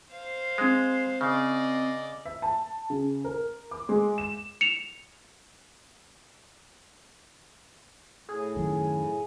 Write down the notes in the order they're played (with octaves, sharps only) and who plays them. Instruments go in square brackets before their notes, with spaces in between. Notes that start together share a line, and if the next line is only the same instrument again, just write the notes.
[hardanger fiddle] C5 F5
[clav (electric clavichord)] G#3 [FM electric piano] C4 C7
[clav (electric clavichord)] C#3 [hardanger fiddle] D5 D#5
[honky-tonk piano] E5
A5
C#3
A#4
D6
G#3
E7
[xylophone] C#7 E7 F7
[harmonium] A2 [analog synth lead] G#4
[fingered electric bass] F#2 D#3